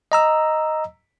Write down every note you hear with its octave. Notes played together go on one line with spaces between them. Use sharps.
D#5 A#5 E6